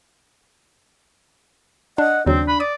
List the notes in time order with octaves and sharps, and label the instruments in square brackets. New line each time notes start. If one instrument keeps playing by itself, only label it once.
[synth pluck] D4 [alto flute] D#5 [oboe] F#5
[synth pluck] D#2 C#3 F#3 [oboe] C4 [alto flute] D4
[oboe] B5
[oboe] D5 [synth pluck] D#6